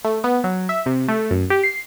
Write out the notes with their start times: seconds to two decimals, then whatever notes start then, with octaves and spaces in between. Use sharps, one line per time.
0.05 A3
0.24 B3
0.44 F#3
0.69 E5
0.86 C3
1.08 A3
1.31 F#2
1.50 G4
1.63 C7